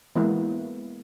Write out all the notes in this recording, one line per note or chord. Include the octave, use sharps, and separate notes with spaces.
E3 G#3 A#3 B3 E4